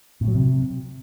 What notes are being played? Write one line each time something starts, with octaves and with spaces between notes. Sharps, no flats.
A2
F#3
C3